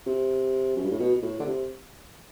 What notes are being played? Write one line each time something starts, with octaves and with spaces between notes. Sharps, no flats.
C3
F#2
G2
A2
B2
B2
A2
D3
C3